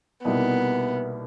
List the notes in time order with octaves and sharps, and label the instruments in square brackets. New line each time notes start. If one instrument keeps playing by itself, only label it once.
[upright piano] C2 B2 G3 A#3 D#4 [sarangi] B3